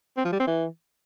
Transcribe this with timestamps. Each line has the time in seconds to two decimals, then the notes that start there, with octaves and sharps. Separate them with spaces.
0.17 C4
0.25 F3
0.32 G3
0.40 C4
0.47 E3